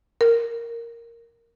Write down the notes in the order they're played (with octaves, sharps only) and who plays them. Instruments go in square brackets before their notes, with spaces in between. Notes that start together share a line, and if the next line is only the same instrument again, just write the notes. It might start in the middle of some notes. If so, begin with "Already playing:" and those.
[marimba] A#4